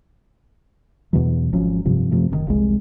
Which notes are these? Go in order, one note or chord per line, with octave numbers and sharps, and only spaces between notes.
E2 B2 E3 F#3
G#1 F3 F#3 C#4
F1 G2 C3 F3
F#2 C3 F3 A3
F#1 B2 D#3
F1 C2 G#3